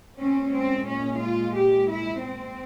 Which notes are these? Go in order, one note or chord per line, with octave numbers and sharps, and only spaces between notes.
A#2 G#3 C4 C#4
C4
C#4
F4
G4
E4
C4